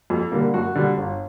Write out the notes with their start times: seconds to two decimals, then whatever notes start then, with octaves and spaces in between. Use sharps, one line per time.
0.10 F2
0.32 D3 G3 A#3
0.54 F#2 F#4
0.75 D3 G3
0.97 G1